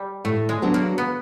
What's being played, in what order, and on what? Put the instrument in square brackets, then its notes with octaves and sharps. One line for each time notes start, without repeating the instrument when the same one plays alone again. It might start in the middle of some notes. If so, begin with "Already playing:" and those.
Already playing: [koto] G3
[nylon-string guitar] A2 [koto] A3
[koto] G#3
[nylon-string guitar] F#3 B3 D4
[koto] A#3
B3